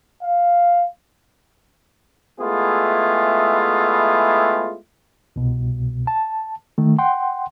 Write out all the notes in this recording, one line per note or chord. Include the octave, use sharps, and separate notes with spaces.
F5
G#3 A3 B3 E4 F4 G#4
C2 B2
A5
D#3 A3
F#5 G5 C6